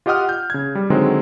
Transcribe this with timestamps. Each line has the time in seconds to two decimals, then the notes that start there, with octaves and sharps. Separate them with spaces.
0.06 F4 G4 D#5 F#5 D#6 F6
0.29 G6
0.50 C#3 G#6
0.75 G3
0.90 D3 D#3 F#3 G#3 C4